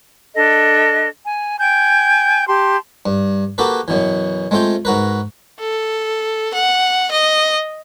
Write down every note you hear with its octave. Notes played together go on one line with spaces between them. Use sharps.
D4 A4 D#5
G#5
G5 G#5 G6
G4 A5 C6
G2
A#3 F#4 G4 A4 B4
F#2 B2 E3
G#3 A3 C4 F4 G5
G#2 F#4 A#4 B4
A4
F#5
D#5